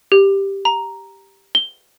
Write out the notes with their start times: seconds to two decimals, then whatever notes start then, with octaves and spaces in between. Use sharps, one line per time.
0.12 G4
0.65 A#5
1.55 G7